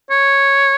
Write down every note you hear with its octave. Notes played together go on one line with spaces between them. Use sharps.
C#5